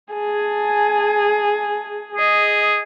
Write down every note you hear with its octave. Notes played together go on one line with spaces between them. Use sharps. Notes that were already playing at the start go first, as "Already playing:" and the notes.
G#4 G#5 A5
G#4 D#5